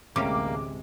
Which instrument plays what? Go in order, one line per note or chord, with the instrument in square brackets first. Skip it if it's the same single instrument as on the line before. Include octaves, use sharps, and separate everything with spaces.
[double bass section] A1 D2 G#3 [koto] C3 G3 C#4 [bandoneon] A#3 [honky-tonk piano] D6